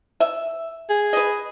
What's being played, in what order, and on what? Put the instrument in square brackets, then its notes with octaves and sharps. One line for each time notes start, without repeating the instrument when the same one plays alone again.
[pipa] E5
[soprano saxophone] G#4
[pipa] B4 D#5